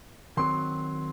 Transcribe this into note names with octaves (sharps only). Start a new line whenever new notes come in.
D#3 F#3 C4 F#4 C6